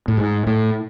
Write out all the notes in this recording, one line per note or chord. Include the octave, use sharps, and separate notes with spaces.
A2
G#2
A2